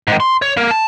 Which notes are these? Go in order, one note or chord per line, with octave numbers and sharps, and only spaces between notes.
G#2 D#3
C6
C#5
A#3 A#4
A5